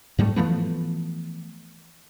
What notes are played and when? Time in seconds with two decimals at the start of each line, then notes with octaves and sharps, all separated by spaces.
0.19 G#2 G3 A3
0.36 E3 F3 A3 B3